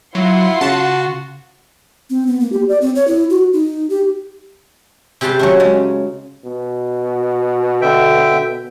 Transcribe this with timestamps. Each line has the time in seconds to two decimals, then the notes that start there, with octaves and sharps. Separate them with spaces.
0.15 F#3 E4 F4 F#5 C6
0.61 C#3 F#4 A5
2.10 C4
2.27 B3
2.40 A#3
2.52 G4
2.69 D5
2.81 C4
2.95 C#5
3.08 E4
3.30 F#4
3.53 D#4
3.90 G4
5.21 C3 G4 G#4 B4 A5 C6
5.39 F#3 A3 C#4
5.60 C#3 G#3
6.45 B2
7.82 D3 E5 G5